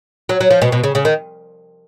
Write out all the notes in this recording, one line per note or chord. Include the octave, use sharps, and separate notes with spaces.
F#3
F#3
F3
B2
B2
C#3
C#3
D#3